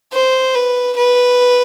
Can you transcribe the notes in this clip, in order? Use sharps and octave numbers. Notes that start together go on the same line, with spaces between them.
C5
B4
B4